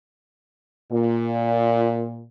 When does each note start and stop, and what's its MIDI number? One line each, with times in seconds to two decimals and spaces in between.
0.92 2.26 46